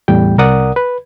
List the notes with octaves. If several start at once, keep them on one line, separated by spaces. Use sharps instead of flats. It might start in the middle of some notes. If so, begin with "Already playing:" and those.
E2 A2 G3 G5
C2 A#4 D5 F#5 D#6
B4